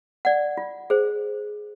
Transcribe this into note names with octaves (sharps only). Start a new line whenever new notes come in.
D5 F#5
F4
G#4 C5